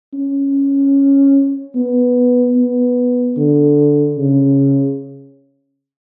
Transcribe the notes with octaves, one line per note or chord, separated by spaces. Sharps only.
C#4
B3
B3
D3
C#3